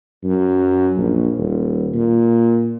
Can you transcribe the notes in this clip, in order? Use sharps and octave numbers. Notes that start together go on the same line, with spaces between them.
F#2
A#1
D#1
A#2